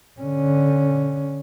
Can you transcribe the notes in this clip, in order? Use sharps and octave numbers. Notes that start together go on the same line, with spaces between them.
D3 C#4